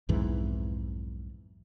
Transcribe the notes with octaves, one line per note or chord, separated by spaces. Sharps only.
B1 F2 G#2 E3